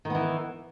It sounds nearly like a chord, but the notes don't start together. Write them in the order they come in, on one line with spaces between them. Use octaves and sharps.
D#3 B3 E3